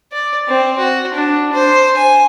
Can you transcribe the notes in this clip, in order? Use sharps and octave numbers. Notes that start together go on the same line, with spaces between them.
D5
C4
F#4
D4
C5
G#5